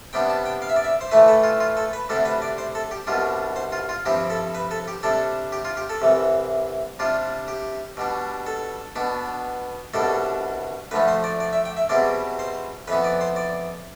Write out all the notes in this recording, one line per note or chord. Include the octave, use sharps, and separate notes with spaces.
C3 G3 B3 D4 G5
A5
G5
F5
E5
D5
E5
C5
A2 E3 A3 E4 B4
A4
F4
F4
A4
B4
D2 C3 G3 D4 A4
B4
D5
C5
A4
G4
C2 B2 G3 D4 F4
C5
F4
F4
G2 F3 C4 E4 G4
A4
B4
A4
G4
C3 G3 D4 A4
G4
F4
G4
A4
C2 C3 E3
C3 G3 D4 F4
G4
B2 G3 D4
A4
B2 B3 D4
C2 B2 G3 D4 A4
D2 D3 F3 A3 B4
C5
D5
D5
E5
G5
E5
E2 B2 G3 C4 E4 D5
C5
F2 E3 B3 B4
D5
C5
D5